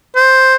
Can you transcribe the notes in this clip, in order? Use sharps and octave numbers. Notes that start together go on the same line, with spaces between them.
C5